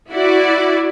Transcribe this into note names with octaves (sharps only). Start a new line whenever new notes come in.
E4 F#4 D5